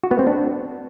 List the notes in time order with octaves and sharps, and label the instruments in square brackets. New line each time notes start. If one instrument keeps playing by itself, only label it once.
[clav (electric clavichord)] F#4
B3
C4
D4